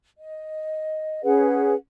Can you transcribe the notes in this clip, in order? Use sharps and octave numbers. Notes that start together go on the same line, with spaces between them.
D#5
C#4 G#4 B4 F#5